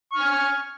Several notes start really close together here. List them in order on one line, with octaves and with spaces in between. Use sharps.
C#6 F6 G#5